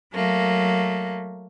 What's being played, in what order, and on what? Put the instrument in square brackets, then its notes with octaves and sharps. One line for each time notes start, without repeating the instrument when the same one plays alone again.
[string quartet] F#3 A3 A#3